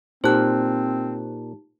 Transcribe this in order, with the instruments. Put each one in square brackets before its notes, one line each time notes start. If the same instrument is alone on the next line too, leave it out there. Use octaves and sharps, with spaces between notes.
[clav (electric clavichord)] A#2 [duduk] C4 [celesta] D#4 G4 A5 [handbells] C5 F#6